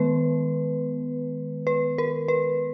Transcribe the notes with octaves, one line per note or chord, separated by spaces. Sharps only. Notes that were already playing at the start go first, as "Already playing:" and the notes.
Already playing: D#3 G#3 B3 B4
B4
A#4
B4